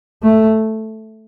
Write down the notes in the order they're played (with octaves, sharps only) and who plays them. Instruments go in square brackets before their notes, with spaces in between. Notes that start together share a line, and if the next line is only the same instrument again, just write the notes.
[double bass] A3